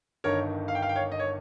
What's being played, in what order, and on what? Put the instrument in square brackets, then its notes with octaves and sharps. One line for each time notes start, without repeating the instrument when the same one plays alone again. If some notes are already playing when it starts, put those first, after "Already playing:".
[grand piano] G1 G2 D#3 A#4 C#5
F5
G5
F5
G5
C#5 F5
D#5
C#5